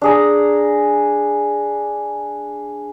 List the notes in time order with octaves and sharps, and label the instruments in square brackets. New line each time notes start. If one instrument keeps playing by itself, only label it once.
[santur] D4 G#4 A#5